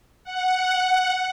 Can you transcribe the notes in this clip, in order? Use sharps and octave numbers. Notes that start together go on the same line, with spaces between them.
F#5